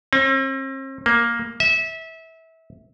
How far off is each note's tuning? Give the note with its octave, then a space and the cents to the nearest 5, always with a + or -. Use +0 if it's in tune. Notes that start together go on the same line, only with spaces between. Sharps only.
C4 +45
A#3 +5
E5 -25